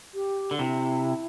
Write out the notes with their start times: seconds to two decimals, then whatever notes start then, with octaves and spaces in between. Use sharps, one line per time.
0.14 G4
0.51 D3
0.59 C3 E4